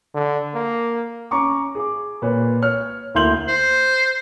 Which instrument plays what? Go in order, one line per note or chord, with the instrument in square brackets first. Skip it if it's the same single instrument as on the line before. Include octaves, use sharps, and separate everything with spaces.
[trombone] D3
A#3
[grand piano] C#4 A#5 C#6 D6
G#4 D6
A#2 B4 C#5
C#5 F6
D2 A#3 E4 C6 G6 F#7
[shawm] C5